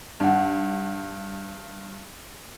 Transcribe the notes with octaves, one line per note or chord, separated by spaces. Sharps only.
G2 D#4 F#5